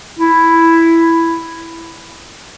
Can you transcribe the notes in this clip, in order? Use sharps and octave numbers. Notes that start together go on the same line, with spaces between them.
E4